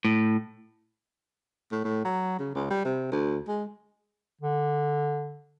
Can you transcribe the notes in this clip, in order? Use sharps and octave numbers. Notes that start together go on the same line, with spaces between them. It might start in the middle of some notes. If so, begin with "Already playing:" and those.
A2
A2
A2
F#3
C#3
C#2
G3
C3
D2
G#3
D3